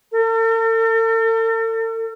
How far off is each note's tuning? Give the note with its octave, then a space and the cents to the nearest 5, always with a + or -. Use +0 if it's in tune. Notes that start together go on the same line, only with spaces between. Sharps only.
A4 +45